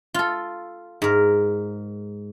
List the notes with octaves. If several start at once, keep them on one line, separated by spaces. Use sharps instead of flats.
F4 A4
G#2 A#4